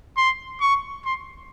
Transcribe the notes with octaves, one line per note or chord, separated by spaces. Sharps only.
C6
C#6
C6